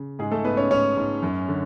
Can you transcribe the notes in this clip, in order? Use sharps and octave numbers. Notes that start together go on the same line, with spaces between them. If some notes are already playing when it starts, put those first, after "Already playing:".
Already playing: C#3
G#2 G#3 G#4
A3 A4
G#2 B3 B4
C#4 C#5
G#2 C#4 C#5
G#2
F#2
D3